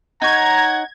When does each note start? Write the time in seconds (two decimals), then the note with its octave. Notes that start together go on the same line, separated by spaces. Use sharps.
0.22 D#4 C#5 F#5 A#5 G#6